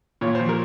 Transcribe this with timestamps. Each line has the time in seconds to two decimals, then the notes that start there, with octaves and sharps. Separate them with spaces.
0.21 A#2 C#5
0.35 C5
0.40 F3
0.49 A#4